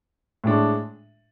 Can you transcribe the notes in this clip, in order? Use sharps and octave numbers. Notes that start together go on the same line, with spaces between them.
A2 G#3 D4